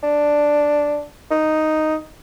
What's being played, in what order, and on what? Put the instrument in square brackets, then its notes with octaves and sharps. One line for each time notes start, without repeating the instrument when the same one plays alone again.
[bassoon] D4
D#4